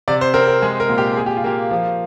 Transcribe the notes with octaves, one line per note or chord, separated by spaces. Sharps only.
C3 D5
C5
C4 A#4
A#4
G#3 G#4
A#4
A#2
G4
A#2 G#4
G4
F4
A#3 G4
F3